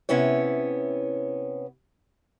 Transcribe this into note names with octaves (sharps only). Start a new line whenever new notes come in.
C3 B3 C#4 E4 C#5